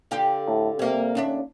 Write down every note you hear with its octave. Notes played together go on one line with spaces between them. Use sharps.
D3 F4 G4
A2
C3 G3 A#3
D#2 C#4 D4 E5